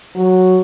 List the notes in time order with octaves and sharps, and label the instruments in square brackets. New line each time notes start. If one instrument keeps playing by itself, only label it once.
[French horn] F#3